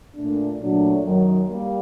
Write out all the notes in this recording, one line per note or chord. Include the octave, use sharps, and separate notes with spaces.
A#2 A3 D4
A#2 F#3 A3 D4
F#2 D#3 F#3
G3 A#3